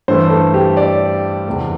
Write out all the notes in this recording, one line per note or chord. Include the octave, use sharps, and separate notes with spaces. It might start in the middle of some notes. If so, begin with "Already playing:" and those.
G2 E3 A3 C5
A4
G4
D5
E2 C3 A3